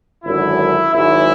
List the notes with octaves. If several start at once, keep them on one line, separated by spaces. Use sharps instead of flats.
G#1 F#2 D3 F#3 E4
G#1 G#2 F#3 E4